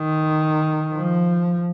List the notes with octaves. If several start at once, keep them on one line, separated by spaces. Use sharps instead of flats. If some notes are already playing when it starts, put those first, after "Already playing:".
Already playing: D#3
F3